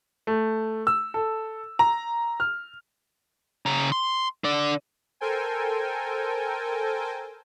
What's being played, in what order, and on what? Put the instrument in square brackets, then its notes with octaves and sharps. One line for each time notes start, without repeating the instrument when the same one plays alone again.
[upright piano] A3
E6
A4
A#5
F6
[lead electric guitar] C#3 A#5
C6
D3 D5
[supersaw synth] A4 A#4 C5 G5 G#5